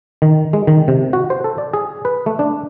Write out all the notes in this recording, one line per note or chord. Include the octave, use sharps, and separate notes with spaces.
D#3
G#3
D#3
C3
F#4
C5
A4
D5
G#4
B4
A3
D4